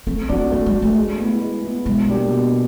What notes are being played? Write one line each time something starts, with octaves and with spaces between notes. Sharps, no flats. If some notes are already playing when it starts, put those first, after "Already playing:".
A3 C4
C4 D4 F#4
A3 A#3
G#3
D4 F#4
A3
G#3
B3
E4
G#3
B3 E4
B2 G#3
G3 A#3 D4 G4
B2